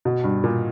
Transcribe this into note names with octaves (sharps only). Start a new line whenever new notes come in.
B2
G2
A#2